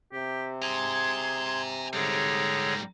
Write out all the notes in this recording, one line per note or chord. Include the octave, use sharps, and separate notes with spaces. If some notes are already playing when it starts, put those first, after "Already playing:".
C3 G4
G#4 G#5 A#5 C6 G#6
G#2 D3 G3 G#4 C#5 A#5